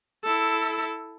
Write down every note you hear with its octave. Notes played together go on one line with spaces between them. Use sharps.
E4 A4